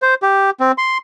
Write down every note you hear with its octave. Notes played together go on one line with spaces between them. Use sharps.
C5
G4
C4
C6